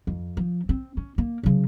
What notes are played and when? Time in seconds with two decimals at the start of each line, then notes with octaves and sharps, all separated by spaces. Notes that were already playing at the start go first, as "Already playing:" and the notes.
0.07 F2
0.37 F3
0.69 C4
0.97 C#4
1.18 A#3
1.43 C#3 F#3